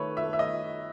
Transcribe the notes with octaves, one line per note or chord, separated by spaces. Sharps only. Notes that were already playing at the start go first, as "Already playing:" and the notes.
Already playing: D#3 A3 D#4 B4 C#5
E5
A3
E5
D#5